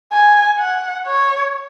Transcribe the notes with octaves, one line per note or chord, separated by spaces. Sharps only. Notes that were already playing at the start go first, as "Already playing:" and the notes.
G#5
F#5
C#5